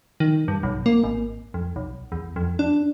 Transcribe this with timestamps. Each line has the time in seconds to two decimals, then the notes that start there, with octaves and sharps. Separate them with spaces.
0.20 D#3
0.48 G2
0.63 B1
0.86 A#3
1.04 G#1
1.54 F2
1.76 B1
2.12 E2
2.36 F2
2.59 D4